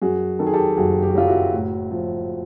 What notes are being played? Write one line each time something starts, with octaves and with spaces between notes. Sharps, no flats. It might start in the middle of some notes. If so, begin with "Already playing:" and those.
F#2 F#4 G#4
D#3 A4
G#4
G4 A4
F#1 F#4 G#4
G4
F#4
F#3 F4 G4
E4 F#4
A2
F3